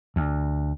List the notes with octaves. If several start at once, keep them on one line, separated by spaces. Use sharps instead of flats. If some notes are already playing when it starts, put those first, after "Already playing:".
D2